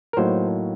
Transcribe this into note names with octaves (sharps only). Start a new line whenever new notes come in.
A#4
A2 F#3 A#3 D#4 C5